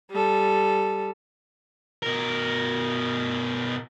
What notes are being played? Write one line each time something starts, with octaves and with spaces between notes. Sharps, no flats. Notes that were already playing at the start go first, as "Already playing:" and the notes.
G3 A4
B2 A#4